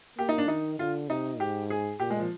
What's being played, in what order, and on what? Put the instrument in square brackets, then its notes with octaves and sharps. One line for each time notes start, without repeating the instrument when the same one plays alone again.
[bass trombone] A#3 [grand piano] G4
[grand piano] D#4
D4
[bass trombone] D#3 [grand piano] D#4
[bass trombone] D3 [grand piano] F4
[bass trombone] C3 [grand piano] D#4
[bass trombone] G#2 [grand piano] G4
[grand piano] G#4
[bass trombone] A#2 [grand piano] G4
[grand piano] G#3
F3